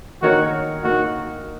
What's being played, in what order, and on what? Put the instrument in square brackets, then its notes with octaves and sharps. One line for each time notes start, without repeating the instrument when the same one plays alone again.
[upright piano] D#3 A#3 D#4 A#4 C#5 [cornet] F#4
[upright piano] A#3 D#4 A#4 [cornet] F#4